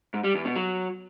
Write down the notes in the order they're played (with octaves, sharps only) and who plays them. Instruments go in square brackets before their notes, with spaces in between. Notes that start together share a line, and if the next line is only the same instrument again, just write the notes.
[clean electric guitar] G#2
G3
E2
B2
F#3